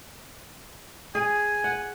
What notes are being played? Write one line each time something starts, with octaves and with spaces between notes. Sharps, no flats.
G#4 G#5
F#5